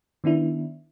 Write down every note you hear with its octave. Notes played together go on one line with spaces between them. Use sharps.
D#3 B3 D4 E4